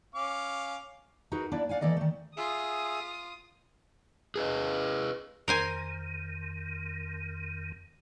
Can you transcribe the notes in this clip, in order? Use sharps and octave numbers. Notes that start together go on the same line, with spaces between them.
C#4 F5 D6
D#4 F#4 G#4 A#4 B4
A#3 D4 E4 D5
D5 F5 F#5 G#5
E3 A#3 A4 D5 D#5
D#3 A3
F4 G#4 E5 D#6
G#4 B4 D#5
F2 D#3 A#4 C5 G#5